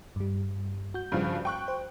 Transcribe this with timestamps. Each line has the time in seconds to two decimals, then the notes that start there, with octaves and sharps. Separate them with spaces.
0.16 G2 G3
0.94 F#4 G6
1.12 G2 C#3 F3
1.45 G5 C#6 F#6
1.68 C5